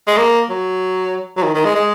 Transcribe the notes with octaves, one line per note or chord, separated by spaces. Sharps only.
G#3
A#3
F#3
F#3
D#3
D#3
G#3
G#3